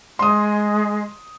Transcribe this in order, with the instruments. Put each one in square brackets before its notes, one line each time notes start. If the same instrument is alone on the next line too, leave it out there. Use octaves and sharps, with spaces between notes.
[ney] G#3 [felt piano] C6 D#6